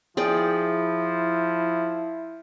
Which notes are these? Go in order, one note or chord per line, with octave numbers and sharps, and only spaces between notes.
F3 E4 G#4 D5 G5